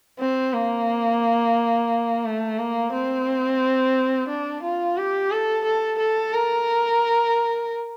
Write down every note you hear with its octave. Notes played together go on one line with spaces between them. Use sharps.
C4
A#3
A3
A#3
C4
D4
F4
G4
A4
A4
A4
A#4